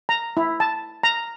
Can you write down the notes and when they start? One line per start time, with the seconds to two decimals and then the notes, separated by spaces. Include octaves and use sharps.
0.09 A#5
0.37 E4
0.60 A5
1.03 A#5